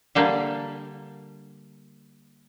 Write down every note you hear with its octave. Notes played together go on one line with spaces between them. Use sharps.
D3 G3 A#3